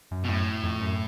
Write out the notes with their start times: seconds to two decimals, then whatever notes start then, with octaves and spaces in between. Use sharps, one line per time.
0.11 F#2
0.24 B2
0.28 F#2 A2
0.63 F2
0.81 F#2